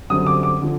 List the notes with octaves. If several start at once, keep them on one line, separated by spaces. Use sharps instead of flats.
F#2 D3 G3 C4 D#6
D6
D6
D3 F3